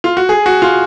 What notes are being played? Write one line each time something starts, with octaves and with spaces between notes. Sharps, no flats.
F4
F#4
G#4
F#4
F4